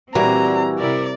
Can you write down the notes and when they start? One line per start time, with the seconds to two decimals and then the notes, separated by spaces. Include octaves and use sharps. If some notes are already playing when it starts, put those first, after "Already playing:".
0.15 A#2 E3 G3 C4 F#4 A#5
0.79 C3 E4 A#4 D5